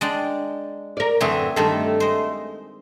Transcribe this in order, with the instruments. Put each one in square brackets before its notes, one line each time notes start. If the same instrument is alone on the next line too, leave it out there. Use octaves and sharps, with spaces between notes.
[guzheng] G#3 D4 G5
[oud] A#4 D5
[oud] F#2 D3 E3 [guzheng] A3 C4 G#4
[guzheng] G2 D#3 C5 [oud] A3 A4
[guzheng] G#3 C5